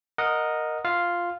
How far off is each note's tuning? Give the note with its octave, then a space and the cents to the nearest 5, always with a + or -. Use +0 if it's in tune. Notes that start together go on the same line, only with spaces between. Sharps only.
A#4 +0 D#5 -5 F#5 -20
F4 +0 F5 +0